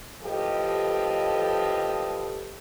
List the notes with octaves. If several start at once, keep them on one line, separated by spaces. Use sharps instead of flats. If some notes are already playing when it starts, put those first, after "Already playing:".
A2 F3 G4 A4 B4 D#5